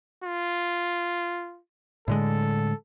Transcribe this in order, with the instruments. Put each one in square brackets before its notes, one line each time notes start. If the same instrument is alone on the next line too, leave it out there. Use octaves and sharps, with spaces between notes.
[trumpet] F4
[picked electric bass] A2 D3 G#3 [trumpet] A4